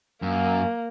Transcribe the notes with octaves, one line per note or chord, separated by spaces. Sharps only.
F#2 A#3